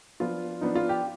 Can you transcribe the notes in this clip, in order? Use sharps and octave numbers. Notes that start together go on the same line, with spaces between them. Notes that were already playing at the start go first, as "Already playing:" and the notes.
F3 B3 D4 F4
F3 B3 D4 D#4
F4
G4